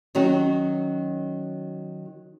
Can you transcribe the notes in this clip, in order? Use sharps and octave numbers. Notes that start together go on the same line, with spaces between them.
D#3 F#3 C#4 F#4